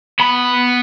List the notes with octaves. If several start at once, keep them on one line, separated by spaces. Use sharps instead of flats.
B3 B5